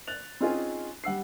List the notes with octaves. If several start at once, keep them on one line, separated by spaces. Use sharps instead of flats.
F#6 A6 F7
C4 C#4 D#4 F4 G#4
G3 F#5 E6 C7